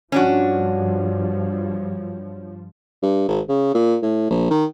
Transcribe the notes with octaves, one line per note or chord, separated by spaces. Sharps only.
G2 F3 C#4 D4 F#4
G2
G#1
C#3
A#2
A2
A#1
D#3